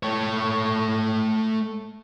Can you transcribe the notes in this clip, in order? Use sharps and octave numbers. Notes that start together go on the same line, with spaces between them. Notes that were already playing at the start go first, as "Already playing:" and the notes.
A3 C#5